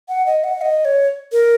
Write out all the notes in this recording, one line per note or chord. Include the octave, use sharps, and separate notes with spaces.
F#5
D#5
F#5
D#5
C#5
A#4